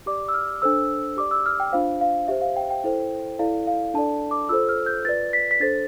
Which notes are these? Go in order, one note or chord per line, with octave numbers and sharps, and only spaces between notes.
G4 D5 D6
E6
F6
D4 A4 C5 E6
G4 D5 D6
E6
F6
G5
D4 F4 C5 F5
F5
G4 C5 E5
F5
G5
G5
E4 A4 C5
E4 A4 D5 F5
F5
D4 A4 D5 A5
D6
F4 A4 C5 E6
F6
G6
F4 B4 D5 A6
B6
B6
D4 A4 C5 A6